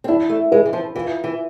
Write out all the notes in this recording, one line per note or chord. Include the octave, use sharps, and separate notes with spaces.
C4
D4 E4
A3
G#3 B4
E3
F3
E3 F4
E3